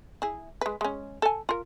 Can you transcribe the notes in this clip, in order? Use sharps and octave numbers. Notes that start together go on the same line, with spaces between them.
E4 G#4
G#3 B4
G#3 C#4
A4 G#5
F4 A#4